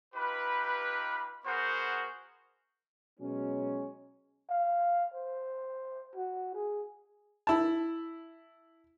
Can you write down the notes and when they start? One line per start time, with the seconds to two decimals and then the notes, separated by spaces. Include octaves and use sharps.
0.15 D#4 F4 G4 B4
1.45 B3 F#4 G#4 A#4 C5 F#5
3.20 B2 F#3 G#3 C#4
4.50 F5
5.14 C5
6.16 F#4
6.54 G#4
7.47 E4 A5